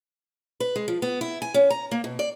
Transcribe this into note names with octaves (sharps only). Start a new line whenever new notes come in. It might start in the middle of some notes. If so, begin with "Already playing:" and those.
B4
G#3
F3
B3
E4
G#5
C#4
A#5
A#3
B2
D5